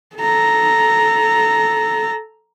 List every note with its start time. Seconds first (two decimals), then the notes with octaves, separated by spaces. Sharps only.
0.16 A4 A#5